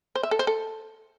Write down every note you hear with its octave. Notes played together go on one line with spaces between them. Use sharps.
C5
E5
A4
C5
A4